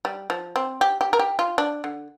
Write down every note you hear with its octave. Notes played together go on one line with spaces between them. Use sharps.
G3
F3
C4
G4
G4
A#4
G4
F4
D4
D3